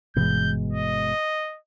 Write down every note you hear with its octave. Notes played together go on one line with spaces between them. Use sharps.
G1 B2 E3 G#3 G6
D#5